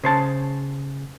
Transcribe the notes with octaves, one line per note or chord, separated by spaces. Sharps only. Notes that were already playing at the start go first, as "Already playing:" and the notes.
C#3 C5 A5